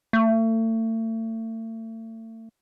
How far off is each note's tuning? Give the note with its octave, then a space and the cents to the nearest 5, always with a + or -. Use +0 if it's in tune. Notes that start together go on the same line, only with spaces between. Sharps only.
A3 +35